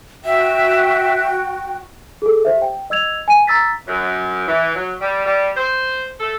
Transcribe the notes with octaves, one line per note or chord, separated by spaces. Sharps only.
F#4 E5 G5
G#4 A4
G4 C5 E5
G5
D#5 E6 G#6 F7
G#5 D#7
A#5 E6 A6 B6
F#2
E3
F#3
G3
G3
C5
A4